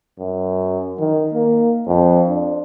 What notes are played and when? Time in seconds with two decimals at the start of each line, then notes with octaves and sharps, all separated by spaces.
0.18 F#2
1.00 D#3
1.34 A#3
1.87 F2
2.28 D4